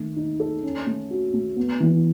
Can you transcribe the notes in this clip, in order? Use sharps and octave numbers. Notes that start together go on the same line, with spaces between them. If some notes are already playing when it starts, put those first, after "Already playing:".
Already playing: D#3 A3
D#4
A4
C#4
A3
F#4
A3
B3
E3